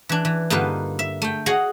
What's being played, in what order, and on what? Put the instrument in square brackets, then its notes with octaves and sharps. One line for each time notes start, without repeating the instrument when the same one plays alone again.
[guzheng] E3 D4
E3
G2 D3 A#3 D#4 F4 B4
E5
A3 G5
F#4 G#4 C#5 D#5 F5 F#5